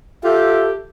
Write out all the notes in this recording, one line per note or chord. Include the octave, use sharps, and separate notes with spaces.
F4 G4 A4 E5